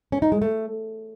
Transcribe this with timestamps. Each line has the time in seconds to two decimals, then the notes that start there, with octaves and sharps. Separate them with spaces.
0.12 C#4
0.22 D#4
0.32 G#3
0.42 A3